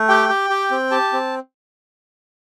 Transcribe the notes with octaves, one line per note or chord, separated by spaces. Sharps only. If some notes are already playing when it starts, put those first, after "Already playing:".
Already playing: A3
G4 G5
G4
G4
C4
G4 A5
C4